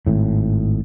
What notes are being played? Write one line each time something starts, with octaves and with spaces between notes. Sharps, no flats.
G#1 A2